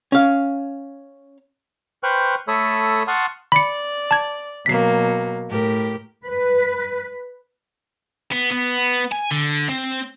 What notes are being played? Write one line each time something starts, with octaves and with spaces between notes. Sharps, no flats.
C#4 F5
B4 C5 G5 C#6 F6 F#6
A3 A4 C#5 B5 D#6 E6
F#5 A5 C6 C#6 D#6 F6
D5 B5 C#7
A5 G#6
B2 F#3 A#3 B6 C7
A2 G4 A#4
B4
B3
B3
G#5
D3
C4